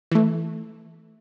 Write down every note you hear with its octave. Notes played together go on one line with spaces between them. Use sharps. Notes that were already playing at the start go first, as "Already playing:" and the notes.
E3 A3